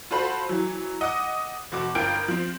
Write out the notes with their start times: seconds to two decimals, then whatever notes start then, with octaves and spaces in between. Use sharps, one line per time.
0.11 F4 F#4 A4 C5 B5
0.49 E3 F#3
1.01 D#5 F#5 D6 D#6
1.72 F1 F#4 D6
1.95 G1 F4 A#4 G5 G6 D7
2.28 F3 C4